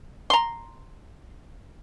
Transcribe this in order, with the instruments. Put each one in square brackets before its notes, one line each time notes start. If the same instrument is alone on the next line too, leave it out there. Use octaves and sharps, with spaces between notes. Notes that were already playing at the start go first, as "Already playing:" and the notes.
[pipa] A#5 C6